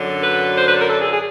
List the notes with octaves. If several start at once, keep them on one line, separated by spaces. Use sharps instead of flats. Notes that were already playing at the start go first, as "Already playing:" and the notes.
Already playing: F#2 D3 F#3
B4
C5
B4
A#4
A4
G#4
G#4